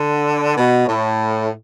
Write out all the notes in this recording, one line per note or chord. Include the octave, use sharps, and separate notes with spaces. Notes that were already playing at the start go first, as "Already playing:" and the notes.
Already playing: D3
B2
A2